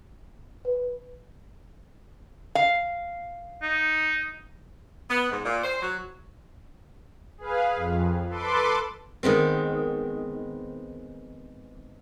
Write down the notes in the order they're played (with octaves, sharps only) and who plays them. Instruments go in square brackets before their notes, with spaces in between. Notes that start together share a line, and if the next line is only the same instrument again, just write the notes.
[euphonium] B4
[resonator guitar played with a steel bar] F5
[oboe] D#4
[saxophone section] B3
G#2
A#2
C5
F#3
[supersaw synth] G#4 B4 F5
F2
A4 B4 C6 D6
[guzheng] D#3 G#3 B3 C4